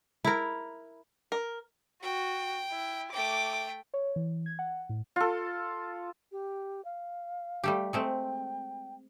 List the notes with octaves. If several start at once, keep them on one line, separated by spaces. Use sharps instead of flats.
E4 A#4
A#4
F#4 G5
E4
A3 G5 D6
C#5
E3
G#6
F#5
A2
F4 A4
G4
F5
G3 A3 G4
G#3 A3 C4 G5